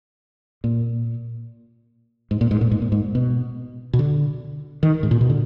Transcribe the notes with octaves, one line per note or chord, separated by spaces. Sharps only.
A#2
G#2
A#2
G#2
A#2
G#2
A#2
G#2
B2
B2
D3
D#3
G#2
A#2
B2
D3